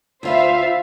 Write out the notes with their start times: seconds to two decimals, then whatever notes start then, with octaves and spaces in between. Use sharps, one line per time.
0.23 D2 F4 B4 C5 E5 F5